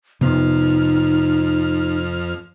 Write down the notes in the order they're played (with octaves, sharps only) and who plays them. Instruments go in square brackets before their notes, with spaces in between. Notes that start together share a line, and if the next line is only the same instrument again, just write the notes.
[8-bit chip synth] F2 F3 F6 [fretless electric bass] C3 B3 [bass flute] D#4